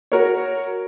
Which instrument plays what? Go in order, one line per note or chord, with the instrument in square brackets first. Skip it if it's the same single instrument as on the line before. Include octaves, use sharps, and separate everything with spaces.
[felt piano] F#4 A#4 C#5